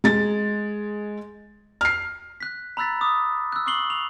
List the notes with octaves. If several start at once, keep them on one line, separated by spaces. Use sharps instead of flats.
G#3 A6
F6 C7
F#6 B6
A#5 B5 E6 F#6 A6 B6
D6 D#6
E6 F#6
C#6 D#6 E6 C7 F#7 G7
F7